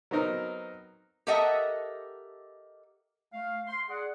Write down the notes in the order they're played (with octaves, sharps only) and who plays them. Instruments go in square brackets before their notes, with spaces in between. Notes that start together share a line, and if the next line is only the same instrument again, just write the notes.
[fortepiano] F#3 B3 C4 D#4 A#4
[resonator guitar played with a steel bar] G4 A4 A#4 D#5 E5 F#5
[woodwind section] A3 F5
C6
G#4 D5 F#5